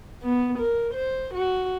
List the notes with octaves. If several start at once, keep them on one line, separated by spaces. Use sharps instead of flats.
B3
A#4
C5
F#4